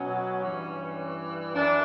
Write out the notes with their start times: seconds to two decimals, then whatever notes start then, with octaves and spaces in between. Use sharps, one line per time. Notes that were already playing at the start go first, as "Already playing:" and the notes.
Already playing: B2 F#3 C#4
0.42 G2 E3
1.54 F#2 E3 D4